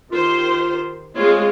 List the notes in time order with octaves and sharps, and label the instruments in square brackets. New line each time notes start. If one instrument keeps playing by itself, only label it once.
[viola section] D#3 G4 C5 [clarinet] F4
[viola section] G#3 C4 F4 [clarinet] C#5